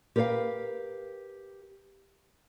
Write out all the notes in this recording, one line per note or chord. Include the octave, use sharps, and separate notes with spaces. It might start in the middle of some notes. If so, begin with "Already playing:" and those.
G4 A#4 B4 C#5 F5 G5